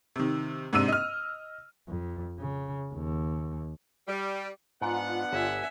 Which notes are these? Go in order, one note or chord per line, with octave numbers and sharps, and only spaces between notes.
C3 D#3
G#2 C3 D4 E6 D#7
D#5 F6
F2
C#3
D#2
G3
G#2 B3 D4 F4 F#5
G1 C#5 E5 G#5